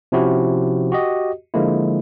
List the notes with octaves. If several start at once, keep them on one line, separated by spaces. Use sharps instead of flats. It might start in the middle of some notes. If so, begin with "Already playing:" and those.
C3 F3 C#4 E4 F#4 G4
F#4 G4 D#5
D3 F3 G#3 A#3 E4